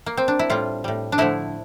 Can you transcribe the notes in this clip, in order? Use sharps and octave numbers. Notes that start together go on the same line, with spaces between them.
A#3
C4
D4
E4
A2 G3 F4
A2 G3
D4
D3 F3 A3 E4